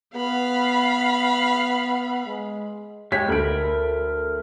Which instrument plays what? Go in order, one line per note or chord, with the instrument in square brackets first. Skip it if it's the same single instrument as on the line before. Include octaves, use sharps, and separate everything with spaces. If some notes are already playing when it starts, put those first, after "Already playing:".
[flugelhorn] B3 [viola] F5 B5
[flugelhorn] G#3
[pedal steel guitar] G#3 G4 C#5 [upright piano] B6
[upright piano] D2 A4 D7 [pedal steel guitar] A#4 B5